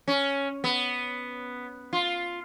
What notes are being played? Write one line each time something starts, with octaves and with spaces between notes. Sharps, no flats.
C#4
B3
F4